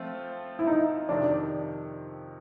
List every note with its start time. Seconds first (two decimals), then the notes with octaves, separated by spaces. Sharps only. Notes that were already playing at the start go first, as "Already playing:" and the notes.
Already playing: F3 A3 C4 F4
0.59 E4
0.67 D#4
1.09 F2 C3 D#3 D4